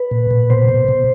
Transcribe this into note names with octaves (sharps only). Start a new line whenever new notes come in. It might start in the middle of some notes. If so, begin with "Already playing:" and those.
Already playing: B4
A#2
A#2
B2 C5
B2
B2